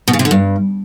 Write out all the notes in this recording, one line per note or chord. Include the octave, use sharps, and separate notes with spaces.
B2
C#3
C3
D3
G2